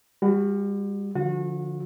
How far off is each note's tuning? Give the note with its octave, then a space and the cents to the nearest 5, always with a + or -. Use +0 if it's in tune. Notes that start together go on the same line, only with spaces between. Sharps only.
G3 +35 F#4 +0
D3 +0 F3 +0 F#4 -30